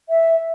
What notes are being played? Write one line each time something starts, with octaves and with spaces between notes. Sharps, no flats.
E5